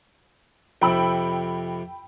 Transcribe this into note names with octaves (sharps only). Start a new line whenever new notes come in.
F2 C3 G5 B5 E6